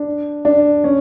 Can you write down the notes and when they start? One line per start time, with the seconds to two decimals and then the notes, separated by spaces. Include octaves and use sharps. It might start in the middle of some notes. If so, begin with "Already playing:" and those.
Already playing: D4
0.45 D4
0.84 C#4